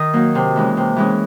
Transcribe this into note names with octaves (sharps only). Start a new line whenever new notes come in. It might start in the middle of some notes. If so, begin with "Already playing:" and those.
Already playing: D#3 D#5
F#3 A#3 D#4
C3
E3 G#3 C#4
C3
E3 G#3 C#4